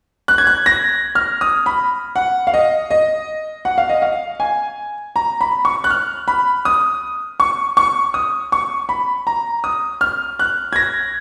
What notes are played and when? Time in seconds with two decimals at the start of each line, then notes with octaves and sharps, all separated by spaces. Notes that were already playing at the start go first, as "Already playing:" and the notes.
0.28 F#6
0.38 G#6
0.47 F#6
0.66 A#6
1.15 F6
1.41 D#6
1.66 B5
2.16 F#5
2.47 F5
2.54 D#5
2.91 D#5
3.65 F#5
3.78 F5
3.89 D#5
4.02 F5
4.40 G#5
5.16 A#5
5.41 B5
5.65 C#6
5.84 F#6
5.90 F6
6.28 B5
6.65 D#6
7.40 C#6
7.77 C#6
8.14 D#6
8.52 C#6
8.89 B5
9.27 A#5
9.64 D#6
10.01 F6
10.39 F#6
10.73 G#6
10.76 A#6